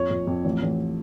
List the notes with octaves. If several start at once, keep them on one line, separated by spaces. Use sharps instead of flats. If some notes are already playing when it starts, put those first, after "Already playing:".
Already playing: F2 C#5
F2
F2
A1
A1